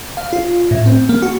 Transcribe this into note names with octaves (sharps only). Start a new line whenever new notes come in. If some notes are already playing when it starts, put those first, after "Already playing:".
F5
F4
A2
C4
A#3
F#4